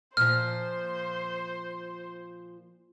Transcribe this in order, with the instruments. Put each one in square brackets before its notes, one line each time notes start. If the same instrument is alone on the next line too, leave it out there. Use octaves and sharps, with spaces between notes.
[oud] A#2 F3 [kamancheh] C5 [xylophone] F6